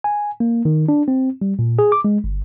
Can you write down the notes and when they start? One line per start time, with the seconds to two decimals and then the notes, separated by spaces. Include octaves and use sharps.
0.04 G#5
0.40 A#3
0.65 D#3
0.89 D4
1.08 C4
1.42 G3
1.59 A#2
1.79 G#4
1.92 D6
2.04 G#3
2.24 G1